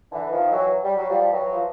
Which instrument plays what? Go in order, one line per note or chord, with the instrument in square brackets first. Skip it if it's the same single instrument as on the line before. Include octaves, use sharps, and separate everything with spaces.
[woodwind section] D3 E3
D#3 F3
E3 F#3
G3
F#3
F3 G3
E3 F#3
F3